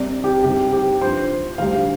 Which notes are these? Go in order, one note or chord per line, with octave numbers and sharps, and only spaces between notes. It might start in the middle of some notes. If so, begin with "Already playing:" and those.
Already playing: C2 C3 G3 D5
G4
C2 C3 G3 G4
G4
G2 F3 C5
D2 D3 G3 F5